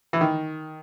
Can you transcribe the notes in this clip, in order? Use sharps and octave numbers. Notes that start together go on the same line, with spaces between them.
E3
D#3